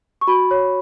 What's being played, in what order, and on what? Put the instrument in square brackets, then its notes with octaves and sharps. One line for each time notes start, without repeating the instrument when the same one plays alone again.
[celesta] C#6
F#4 B5
C#5